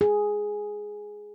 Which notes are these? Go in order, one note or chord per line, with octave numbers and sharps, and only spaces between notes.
G#4